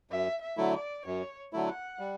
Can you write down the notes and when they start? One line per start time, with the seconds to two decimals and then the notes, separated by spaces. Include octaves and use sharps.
0.11 F#2 E5
0.42 E5
0.57 D3 F#3 A3 E4
0.74 D5
1.05 F#2 C#5
1.53 D3 F#3 A3 E4
1.68 F#5
1.99 G3